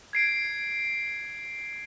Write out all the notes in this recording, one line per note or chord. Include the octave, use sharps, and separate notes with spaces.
G#6 C7 D7